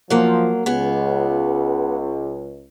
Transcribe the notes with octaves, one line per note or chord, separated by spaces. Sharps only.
F3 F#3 A#3
C#2 B3 G#4